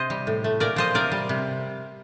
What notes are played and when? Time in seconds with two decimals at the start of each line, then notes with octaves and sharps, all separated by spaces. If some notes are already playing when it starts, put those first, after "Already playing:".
Already playing: C3 C5 D#5
0.10 G3
0.27 A2
0.44 A3
0.60 A#2 A#4 D5
0.76 F3 C5 D#5
0.94 C3 A#4 D5
1.12 G3
1.29 C3